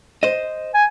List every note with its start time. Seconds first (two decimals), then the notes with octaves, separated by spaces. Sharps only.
0.23 C5 D#5
0.75 G#5